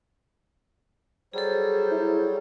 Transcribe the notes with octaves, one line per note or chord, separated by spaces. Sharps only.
F#3 G3 G#4 A4 C5
E4